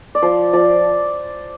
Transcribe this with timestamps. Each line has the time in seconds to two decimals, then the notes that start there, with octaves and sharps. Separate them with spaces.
0.15 D5
0.22 F3 C5
0.53 F3 D5